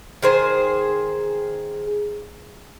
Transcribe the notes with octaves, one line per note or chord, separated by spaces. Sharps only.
D#3 G#4 C5